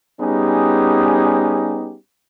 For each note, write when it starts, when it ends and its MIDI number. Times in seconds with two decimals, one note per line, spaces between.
0.21 1.97 55
0.21 1.97 59
0.21 1.97 61
0.21 1.97 63
0.21 1.97 67
0.21 1.97 68